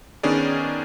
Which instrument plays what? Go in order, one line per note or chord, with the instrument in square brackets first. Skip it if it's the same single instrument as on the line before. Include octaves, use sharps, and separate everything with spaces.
[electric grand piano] D#3 B3 C#4 D4 G#4 D5